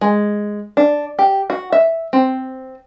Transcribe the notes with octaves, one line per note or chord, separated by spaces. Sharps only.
G#3
D4
G4
F#4
E5
C4